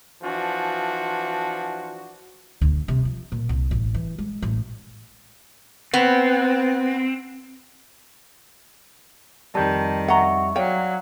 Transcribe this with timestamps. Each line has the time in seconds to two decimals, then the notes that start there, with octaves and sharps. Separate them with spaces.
0.22 E3 F3 D4 F#4
2.61 D2
2.88 C3
3.05 F3
3.32 A#2
3.49 C2
3.71 A1
3.94 E3
4.18 G#3
4.42 A1
5.94 B3 C4
9.55 F2 D#3 G3 A5 G6
10.08 E5 F#5 A#5 C#6
10.56 F#3 C#5 D5 F5 G5